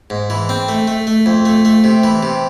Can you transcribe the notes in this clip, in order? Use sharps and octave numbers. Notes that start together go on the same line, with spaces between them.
G#2
E3
C4
A3
A3
A3
F2
A3
A3
C3
E3
C3